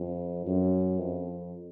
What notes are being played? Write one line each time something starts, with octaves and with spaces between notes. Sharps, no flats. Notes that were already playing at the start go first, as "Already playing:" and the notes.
Already playing: F2
F#2
F2